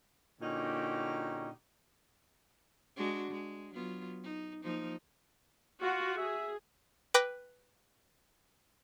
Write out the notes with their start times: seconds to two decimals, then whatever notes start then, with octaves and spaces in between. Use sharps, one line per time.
0.41 A#2 D3 C#4 D#4 F#4 G4
2.96 G#3 D4 F#4
3.31 G#3
3.74 F#3 B3 F4
4.23 D#4
4.63 F3 A#3 D#4
5.82 F4 F#4
6.18 G#4 E5
7.14 B4 G5 D6 A#6